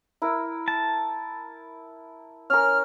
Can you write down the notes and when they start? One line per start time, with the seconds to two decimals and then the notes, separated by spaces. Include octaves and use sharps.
0.22 E4 A#4
0.68 A5
2.50 C#4 A#4 F6